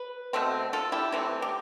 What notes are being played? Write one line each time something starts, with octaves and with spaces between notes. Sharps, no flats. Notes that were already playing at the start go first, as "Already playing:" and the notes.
Already playing: B4
B2 A3 C4
F4 A4
E4 G4
C3 E3 A3 C4
G4